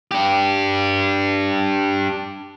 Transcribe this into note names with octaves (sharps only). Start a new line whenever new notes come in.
D4 G4